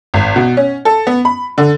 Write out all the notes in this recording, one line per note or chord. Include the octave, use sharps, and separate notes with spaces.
G#1
B2
C#4
A4
B3
B5
D3